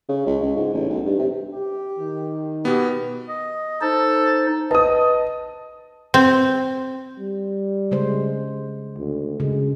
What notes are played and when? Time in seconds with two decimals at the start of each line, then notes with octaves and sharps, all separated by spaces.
0.09 C#3
0.26 C#2
0.42 C#2
0.56 G#2
0.74 A1
0.89 B1
1.06 G2
1.19 C3
1.54 G4
1.99 D#3
2.65 B2 B3 G4
3.29 D#5
3.81 D#4 A4 C5
4.71 B4 D#5 A5 D#6
6.14 C4
7.19 G3
7.91 C#3 G#3 C5
8.97 D2
9.40 C#3 G#3